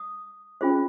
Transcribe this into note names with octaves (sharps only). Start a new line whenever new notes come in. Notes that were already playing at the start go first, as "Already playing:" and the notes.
Already playing: D#6
C#4 F4 G#4 C5